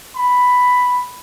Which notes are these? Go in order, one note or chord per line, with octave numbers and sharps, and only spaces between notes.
B5